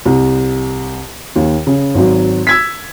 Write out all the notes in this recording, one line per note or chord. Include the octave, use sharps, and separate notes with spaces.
C2
D#2
C#3
G#1 F#3
E6 G#6 B6